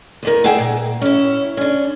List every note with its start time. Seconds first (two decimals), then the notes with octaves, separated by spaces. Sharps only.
0.23 E2 B3 A#4
0.44 D4 G#4 E5 F#5 G5
0.58 A#2
1.01 C#4 E4
1.57 C#4 D4